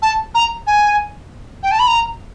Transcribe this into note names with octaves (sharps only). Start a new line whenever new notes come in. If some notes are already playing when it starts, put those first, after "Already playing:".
A5
A#5
G#5
G5
A5
B5
A#5